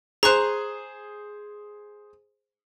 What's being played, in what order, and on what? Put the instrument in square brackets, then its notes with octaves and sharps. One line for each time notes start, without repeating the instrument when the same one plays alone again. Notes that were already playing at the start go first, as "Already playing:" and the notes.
[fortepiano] G#4 C5 [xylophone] A#5 C#6 F#6